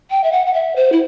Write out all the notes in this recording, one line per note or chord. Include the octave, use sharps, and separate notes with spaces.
G5
E5
F#5
F#5
E5
C5
E4